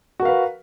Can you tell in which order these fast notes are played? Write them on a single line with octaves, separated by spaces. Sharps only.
F#4 A#4 F5 B4